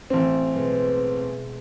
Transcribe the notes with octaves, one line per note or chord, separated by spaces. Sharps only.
A1 C4
B2 G#3 A3